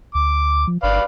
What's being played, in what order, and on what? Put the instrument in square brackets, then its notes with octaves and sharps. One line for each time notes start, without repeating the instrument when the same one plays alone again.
[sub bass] D2 [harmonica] D6
[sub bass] F3
[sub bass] G1 [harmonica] B4 D5 F5